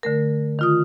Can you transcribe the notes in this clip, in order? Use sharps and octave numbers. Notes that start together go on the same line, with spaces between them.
D3 A3 A#4
D#3 F4 D#6